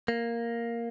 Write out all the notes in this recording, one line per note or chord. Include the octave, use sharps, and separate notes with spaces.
A#3